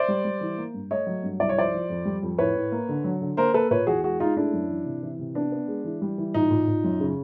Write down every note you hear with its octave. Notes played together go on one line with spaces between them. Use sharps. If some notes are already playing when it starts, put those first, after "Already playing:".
Already playing: C5 D5
G3
G3
E3
A#3
G2
A3 C#5 D#5
F#3
G2
C2 D5
C#5
F3 C5 D5
F3
F2
G3
F2
A2 B4 C#5
A2
A#3
D3
F#3
D3
A#3 A#4 C5
A#3 A4 B4
A#2 B4 C#5
E2 F#4 G#4
G#3 F#4 G#4
G#3 D#4 F4
A3 D4 E4
F#2
E3
C3
E3
C3
B3 D4
B3
G#3
E3
G3
E3
A#2 D#4
A#2
A#2
F#2
C#3